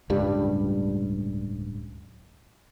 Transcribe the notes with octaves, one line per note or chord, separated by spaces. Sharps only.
D1 C#2 G2 G3